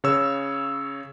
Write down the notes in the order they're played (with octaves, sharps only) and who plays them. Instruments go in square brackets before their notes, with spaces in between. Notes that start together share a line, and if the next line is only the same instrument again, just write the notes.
[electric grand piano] C#3 C#5 E6